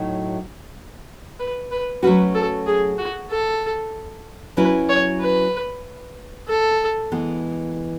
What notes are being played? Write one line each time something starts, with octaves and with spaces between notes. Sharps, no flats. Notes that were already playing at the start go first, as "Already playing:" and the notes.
Already playing: A2 F#3 A3 D#4
B4
B4
F#3 A3 C#4 F#4 B4
A4
G#4
F#4
A4
F#3 C#4 E4 B4
C#5
B4
A4
E3 G#3 B3